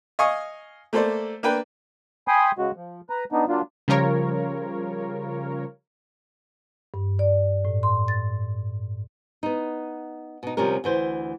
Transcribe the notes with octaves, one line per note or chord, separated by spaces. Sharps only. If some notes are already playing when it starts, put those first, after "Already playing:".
D#5 F5 G#5 C#6 D#6
A3 A#3 A4 C5 D5
A#3 D4 B4 G5
G5 G#5 B5 C6 D#6
C#3 G#3 F#4
F3
B4 A#5
B3 D4 D#4
F#3 A#3 D4 F4
C#3 F3 G3 F4 A#4 C#5
G2
D5
A2
C6
A6
B3 D#4
B2 D#4
D2 C3 F3 G3 C#4 A#4
D2 E3 C5